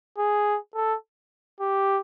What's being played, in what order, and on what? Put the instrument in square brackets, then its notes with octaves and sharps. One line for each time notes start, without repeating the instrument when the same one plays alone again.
[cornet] G#4
A4
G4